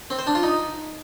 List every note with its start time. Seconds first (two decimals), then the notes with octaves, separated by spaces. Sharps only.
0.10 C4
0.19 C5
0.27 D4
0.35 F4
0.43 D#4